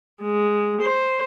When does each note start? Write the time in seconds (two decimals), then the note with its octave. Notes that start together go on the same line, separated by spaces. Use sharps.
0.23 G#3
0.82 C5